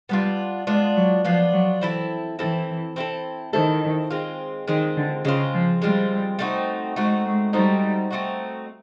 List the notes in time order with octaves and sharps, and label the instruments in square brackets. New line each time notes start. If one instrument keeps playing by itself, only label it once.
[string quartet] G3 [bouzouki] B3 D4 F4
[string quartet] G#3 [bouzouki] B3 D4 F4
[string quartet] F#3
[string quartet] F3 [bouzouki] B3 D4 F4
[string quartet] F#3
[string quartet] E3 [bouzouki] C4 E4 A4
[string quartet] E3 [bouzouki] C4 E4 A4
[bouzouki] C4 E4 A4
[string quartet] D#3 [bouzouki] C4 E4 A4
[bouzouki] G#3 C4 F4
[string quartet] D#3 [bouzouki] G#3 C4 F4
[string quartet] D3
[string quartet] C#3 [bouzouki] G#3 C4 F4
[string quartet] F3
[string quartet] G3 [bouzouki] G#3 C4 F4
[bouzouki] A3 C4 D#4 F#4
[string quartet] G#3 [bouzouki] A3 C4 D#4 F#4
[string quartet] G#3
[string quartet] G3 [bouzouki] A3 C4 D#4 F#4
[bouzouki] A3 C4 D#4 F#4